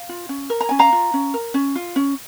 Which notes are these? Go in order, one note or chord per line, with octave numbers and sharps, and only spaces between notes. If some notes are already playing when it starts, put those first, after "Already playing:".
Already playing: F5
F4
C#4
A#4
A#5
C#4 G#5
F5 A#5
F4
C#4
A#4
C#4
F4
C#4